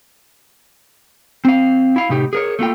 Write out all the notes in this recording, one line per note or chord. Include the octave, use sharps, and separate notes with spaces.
C4 F5
E4 F5
A2 C3 D#4 G4
G#4 A#4 C#5
A3 A#3 F4 G5